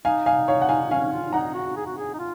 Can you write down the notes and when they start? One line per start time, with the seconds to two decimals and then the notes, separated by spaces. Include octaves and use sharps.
0.05 D#4 F5 G#5
0.26 F5 G#5
0.48 C#5 F5
0.62 F#5
0.69 F5 G#5
0.91 C#4 F5 G#5
1.12 F4
1.33 D#4 F#5 A#5
1.54 F#4
1.76 G#4
1.86 F#4
1.97 G#4
2.14 D#4
2.19 F4